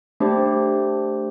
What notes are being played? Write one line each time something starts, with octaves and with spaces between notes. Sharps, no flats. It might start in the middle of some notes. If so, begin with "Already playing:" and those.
A3 D4 G4 C5